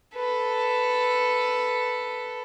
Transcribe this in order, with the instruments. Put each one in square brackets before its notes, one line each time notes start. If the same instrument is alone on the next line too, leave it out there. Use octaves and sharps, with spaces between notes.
[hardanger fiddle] A4 B4